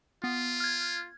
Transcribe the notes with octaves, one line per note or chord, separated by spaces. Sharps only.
B3 F4
F6 G#6